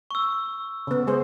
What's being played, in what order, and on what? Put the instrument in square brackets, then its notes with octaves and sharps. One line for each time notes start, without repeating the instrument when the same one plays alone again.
[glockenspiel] C#6 E6
[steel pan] C#3 B3
G#3 G#4 C5